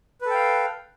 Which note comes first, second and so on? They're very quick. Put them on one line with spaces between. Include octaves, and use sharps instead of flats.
B4 A4 G5 F5